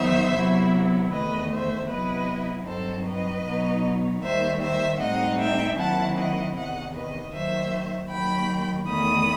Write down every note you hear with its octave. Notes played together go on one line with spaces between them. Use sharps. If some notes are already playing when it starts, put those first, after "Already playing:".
Already playing: E2 D#3 F#3 B3 D#4 C5 E5
C3 F#3 B3 E4
E2 D#3 A3 B4 D#5
C5 E5
C3 F#3 B3 E4 B4 D#5
G2 F#3 C4 D#4 A4 C5
B4 D#5
B2 F#3 B3 D#4
D#2 D#3 G3 C5 E5
C5 E5
A2 G3 C4 D#4 D#5 F#5
E5 G5
D#2 D#3 F#3 C4 E4 F#5 A5
D#5 F#5
E2 C3 D#3 D#5 F#5
B4 D#5
D#2 D#3 F#3 C5 E5
D#2 D#3 F#3 G5 B5
E2 D#3 A3 B5 D#6